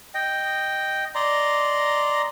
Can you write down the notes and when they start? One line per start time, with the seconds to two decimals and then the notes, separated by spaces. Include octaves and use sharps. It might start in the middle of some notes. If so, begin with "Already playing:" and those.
0.14 D#5 G5
1.15 D5 D#5 A#5 C6